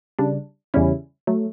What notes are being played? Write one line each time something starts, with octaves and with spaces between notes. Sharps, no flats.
C#3 G3 D4
E2 C#3 G3 C#4 E4
F#3 A3